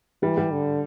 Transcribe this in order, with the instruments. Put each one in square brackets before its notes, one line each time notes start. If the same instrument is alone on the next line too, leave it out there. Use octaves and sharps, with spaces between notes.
[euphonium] E3 [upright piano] G3
[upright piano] G3
[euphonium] D3